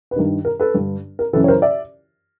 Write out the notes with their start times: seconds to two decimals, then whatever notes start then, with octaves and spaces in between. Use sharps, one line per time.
0.11 B4
0.16 G2 D#3 A#4
0.45 A#4
0.60 A4 B4
0.74 G2 D3
1.19 A#4
1.33 F#2 C#3 E3 A4 B4
1.44 C#5
1.48 A#4 C5
1.62 D5 E5